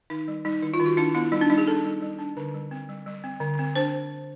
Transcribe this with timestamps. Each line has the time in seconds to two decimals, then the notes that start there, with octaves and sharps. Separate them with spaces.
0.10 D#3 D#4
0.28 G3
0.45 G3 D#4
0.63 D#3 E4
0.74 F4
0.80 D#3
0.86 F#4
0.97 D4 E4
1.15 B3 E4
1.32 G3 D#4
1.41 D4
1.50 G3 D#4
1.58 G#4
1.67 D4 A4
1.84 G3
2.02 G3
2.19 D4
2.37 D3 B4
2.54 G3
2.71 C4
2.89 G3
3.06 G3
3.24 C4
3.40 D3
3.59 C4
3.75 D4 C5